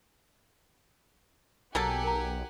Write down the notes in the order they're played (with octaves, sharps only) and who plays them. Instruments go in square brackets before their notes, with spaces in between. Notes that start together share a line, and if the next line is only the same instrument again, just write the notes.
[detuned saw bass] B1 [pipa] F#3 A#3 A4 [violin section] G4 F#5 G#5
[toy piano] A#4 A#5